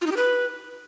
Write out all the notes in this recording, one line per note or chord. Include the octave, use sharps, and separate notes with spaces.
F4
D#4
G4
B4